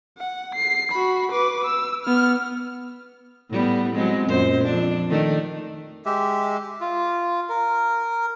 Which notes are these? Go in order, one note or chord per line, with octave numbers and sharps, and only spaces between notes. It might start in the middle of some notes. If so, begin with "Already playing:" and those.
F#5
C7
F#4 B5
B4 D6
E6
B3 F6
A2 G3 B3
F#3 G#3 C4
F#2 A#2 C5
F2 D4
D#3 A3 D4
G#3 G4 E5
F4
A#4